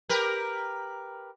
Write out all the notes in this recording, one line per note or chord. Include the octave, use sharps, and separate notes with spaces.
G4 A#4 B4